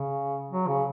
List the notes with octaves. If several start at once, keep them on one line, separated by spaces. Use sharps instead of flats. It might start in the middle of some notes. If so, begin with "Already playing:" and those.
Already playing: C#3
F#3
C#3